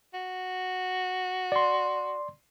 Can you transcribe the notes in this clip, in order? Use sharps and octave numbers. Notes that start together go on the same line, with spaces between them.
F#4
D5 C6